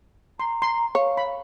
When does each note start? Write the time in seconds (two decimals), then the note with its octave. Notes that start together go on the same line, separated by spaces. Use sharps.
0.40 A#5 C6
0.62 C6
0.95 C#5 F5
1.17 B5